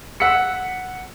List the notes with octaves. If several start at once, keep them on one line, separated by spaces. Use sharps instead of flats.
F#5 E6 B6 C#7